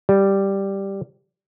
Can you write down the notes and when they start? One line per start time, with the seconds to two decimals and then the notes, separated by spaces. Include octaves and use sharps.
0.09 G3